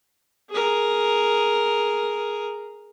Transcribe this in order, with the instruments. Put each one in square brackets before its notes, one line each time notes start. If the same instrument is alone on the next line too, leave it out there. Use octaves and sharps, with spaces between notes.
[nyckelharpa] G#4 A#4